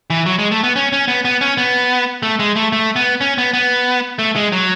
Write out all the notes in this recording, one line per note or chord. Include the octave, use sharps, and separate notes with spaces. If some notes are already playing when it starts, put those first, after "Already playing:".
E3
F#3
G#3
A3
B3
C#4
C#4
B3
B3
C#4
B3
A3
G#3
A3
A3
B3
C#4
B3
B3
A3
G#3
F#3